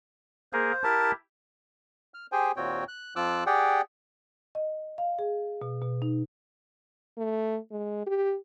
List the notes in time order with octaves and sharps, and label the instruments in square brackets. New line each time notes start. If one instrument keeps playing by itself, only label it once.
[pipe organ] A#3 G#4 A#4 [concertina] C5
[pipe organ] E4 G4 [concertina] A#4 A5
[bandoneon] F6
G4 G#4 C5 G5 G#5
D#2 A#2 C4 F#4 C#5 G5
F#6
F2 F3 F4 D6 E6 F#6
G4 G#4 D5 F#5 G5
[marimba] D#5
F5
G#4
B2
B2
D#4
[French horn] A3
G#3
G4